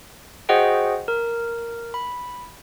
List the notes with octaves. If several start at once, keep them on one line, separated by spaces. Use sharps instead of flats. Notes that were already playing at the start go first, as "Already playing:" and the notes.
F#4 G#4 C5 D#5 F#5 G5
A#4
B5